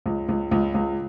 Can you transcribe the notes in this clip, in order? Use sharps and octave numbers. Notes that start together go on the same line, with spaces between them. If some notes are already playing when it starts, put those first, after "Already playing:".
C#2
C#2
C#2
C#2